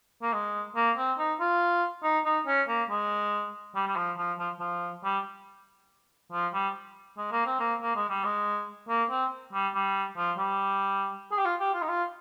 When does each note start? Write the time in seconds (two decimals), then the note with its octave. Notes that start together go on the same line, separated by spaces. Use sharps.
0.22 A#3
0.33 G#3
0.76 A#3
0.97 C4
1.19 D#4
1.40 F4
2.03 D#4
2.25 D#4
2.47 C#4
2.68 A#3
2.90 G#3
3.75 G3
3.88 G3
3.96 F3
4.18 F3
4.39 F3
4.59 F3
5.04 G3
6.32 F3
6.53 G3
7.17 G#3
7.32 A#3
7.46 C4
7.60 A#3
7.82 A#3
7.96 G#3
8.09 G3
8.24 G#3
8.89 A#3
9.10 C4
9.53 G3
9.75 G3
10.17 F3
10.38 G3
11.32 G#4
11.38 G4
11.45 F4
11.60 G4
11.74 F4
11.82 D#4
11.89 F4